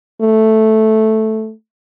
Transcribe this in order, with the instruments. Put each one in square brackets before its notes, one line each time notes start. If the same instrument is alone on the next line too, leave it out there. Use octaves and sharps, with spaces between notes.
[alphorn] A3